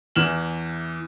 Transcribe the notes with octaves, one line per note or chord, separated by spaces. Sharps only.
E2 E3 F6 E7 F#7